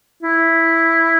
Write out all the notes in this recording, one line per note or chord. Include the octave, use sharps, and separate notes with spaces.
E4